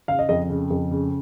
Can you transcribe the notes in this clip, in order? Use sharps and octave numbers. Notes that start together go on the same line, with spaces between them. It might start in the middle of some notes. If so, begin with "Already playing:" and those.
C#3 F5
D#5
F2 D#5
C#3
F2
C#3